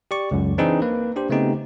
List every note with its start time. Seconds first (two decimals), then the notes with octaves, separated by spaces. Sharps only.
0.11 G4 D5 C#6
0.31 C#2 F#2
0.58 E3 C4 D4 D#4 G#4 B4
0.82 A#3 B4
1.16 D4 G4 C5
1.30 C#3 A3 B3 C4 D#4 G4